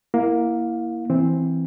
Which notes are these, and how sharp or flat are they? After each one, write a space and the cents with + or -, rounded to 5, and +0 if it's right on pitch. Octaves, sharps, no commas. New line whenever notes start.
A#3 +5 E4 +0 F5 +35
E3 +0 C4 +0